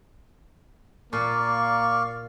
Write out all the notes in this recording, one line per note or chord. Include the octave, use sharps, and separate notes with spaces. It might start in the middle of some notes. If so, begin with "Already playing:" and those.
A#2 A#3 D5 F5 C#6